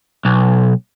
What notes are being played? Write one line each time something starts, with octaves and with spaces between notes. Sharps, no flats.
B1